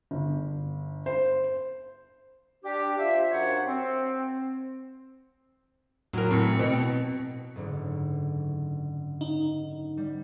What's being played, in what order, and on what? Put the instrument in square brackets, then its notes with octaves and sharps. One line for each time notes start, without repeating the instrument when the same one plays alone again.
[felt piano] G1
C5
[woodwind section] D4 G4
F4 C5 E5
F#2 F#3 D4 C5 C#5 F#5
C4
[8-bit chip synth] A2 [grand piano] F#3 A#4
[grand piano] A2 [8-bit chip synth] C4 C#7
[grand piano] E3
B2
[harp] F#1 G#2 D3
[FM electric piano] D#4
[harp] G3